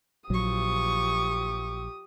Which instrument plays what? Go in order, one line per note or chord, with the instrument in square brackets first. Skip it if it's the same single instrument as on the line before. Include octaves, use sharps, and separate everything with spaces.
[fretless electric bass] A#1 F#3 [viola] F3 C#6 [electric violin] G4 D#6